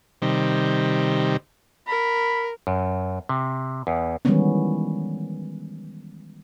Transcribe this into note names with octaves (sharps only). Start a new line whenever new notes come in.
C3 D#3 G3
A#4 B5
F#2
C3
E2
D#3 E3 G3 G#3 B3 C#4